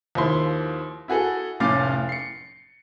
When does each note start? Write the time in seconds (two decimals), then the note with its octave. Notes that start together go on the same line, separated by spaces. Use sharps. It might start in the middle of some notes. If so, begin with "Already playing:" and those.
0.15 D#2 F3 E4 C6
1.08 E4 F#4 G#4 A4
1.60 F1 A2 C#4 F5 D6 A6
2.09 C7 C#7